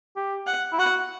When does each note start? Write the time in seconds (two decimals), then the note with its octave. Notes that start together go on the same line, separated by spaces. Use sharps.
0.17 G4
0.47 F#5
0.73 E4
0.79 F#4 F#5